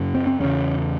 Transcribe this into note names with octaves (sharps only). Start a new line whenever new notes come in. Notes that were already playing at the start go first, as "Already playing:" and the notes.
Already playing: F#2 C#3
C4
C4
E2 C#3 C#4